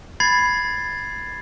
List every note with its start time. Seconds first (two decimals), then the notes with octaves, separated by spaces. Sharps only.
0.20 B5 G#6 A6 C7